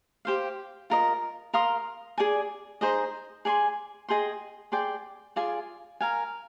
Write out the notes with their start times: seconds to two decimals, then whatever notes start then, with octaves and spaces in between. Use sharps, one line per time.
0.25 G4 C5 F5
0.90 F4 A#4 D#5
1.54 A#4 F5 C6 D#6
2.18 G#4 D5 G#5
2.81 D#4 G#4 C5 D#5
3.45 G#4 D5 G#5 C6
4.09 G#4 D#5 G5 C6
4.72 G#4 D5 G5 C6
5.36 F4 G#4 D5 G#5
6.01 A#4 F5 G#5